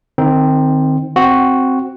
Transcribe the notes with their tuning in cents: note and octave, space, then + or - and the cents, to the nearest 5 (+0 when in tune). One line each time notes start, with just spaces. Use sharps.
D#3 -30 C4 +0 D#4 +10
C4 +0 F#4 +0